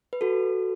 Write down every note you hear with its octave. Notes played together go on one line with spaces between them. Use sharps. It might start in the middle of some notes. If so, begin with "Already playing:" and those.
B4
F#4 A4